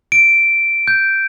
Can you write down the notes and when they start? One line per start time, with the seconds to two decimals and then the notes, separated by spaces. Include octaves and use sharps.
0.12 D7
0.88 G6